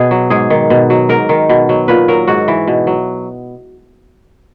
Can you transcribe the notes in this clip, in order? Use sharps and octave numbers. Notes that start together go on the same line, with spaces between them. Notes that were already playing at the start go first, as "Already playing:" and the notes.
Already playing: B2 G#4
F#3
G#2 G#4
D#3
B2
F#3
G#2 A#4
D#3
B2
F#3
A#2 B4
F#3 A#4
G#2 F#4
E3
B2
F#3